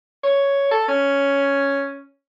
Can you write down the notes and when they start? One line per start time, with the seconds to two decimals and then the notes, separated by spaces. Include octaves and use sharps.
0.23 C#5
0.71 A4
0.88 C#4